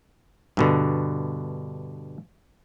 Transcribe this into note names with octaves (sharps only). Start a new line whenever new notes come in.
G2 B2 D3